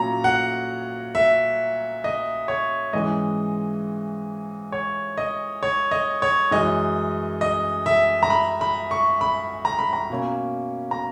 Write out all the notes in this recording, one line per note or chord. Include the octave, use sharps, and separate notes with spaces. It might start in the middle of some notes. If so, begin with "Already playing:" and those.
Already playing: A#2 F#3 C#4 A#5
F#5
E5
D#5
C#5
G#2 E3 G#3 C#4 D#5
C#5
D#5
C#5
D#5
C#5
F#2 E3 G#3 D#5
D#5
E5
A#5
B5
B5
C#6
B5
A#5
B5
A#5
B2 A#3 C#4
A#5